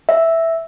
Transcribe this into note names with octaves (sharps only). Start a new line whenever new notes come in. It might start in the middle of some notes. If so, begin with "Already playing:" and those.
E5